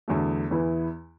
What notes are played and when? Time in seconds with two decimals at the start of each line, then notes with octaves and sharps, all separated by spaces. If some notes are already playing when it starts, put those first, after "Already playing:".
0.08 E2 D3 F#3 A3
0.51 E2 E3 B3 E4